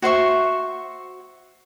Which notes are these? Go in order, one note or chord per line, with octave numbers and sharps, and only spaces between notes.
F#4 C5 E5 C#6